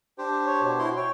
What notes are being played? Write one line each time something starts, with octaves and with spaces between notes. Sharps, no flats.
D4 G4 C5
C#5
B2
E4 F#4 C6
C#5 G5